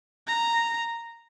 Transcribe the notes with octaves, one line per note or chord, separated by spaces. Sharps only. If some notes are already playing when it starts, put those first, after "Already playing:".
A#5